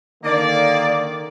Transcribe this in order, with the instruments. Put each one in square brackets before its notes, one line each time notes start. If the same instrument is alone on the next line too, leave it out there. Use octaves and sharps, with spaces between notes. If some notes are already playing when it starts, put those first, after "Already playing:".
[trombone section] D3 D#3 [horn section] A#3 D5